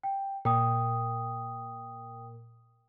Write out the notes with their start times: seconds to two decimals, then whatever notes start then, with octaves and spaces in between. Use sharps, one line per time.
0.03 G5
0.45 A#2 G5 D#6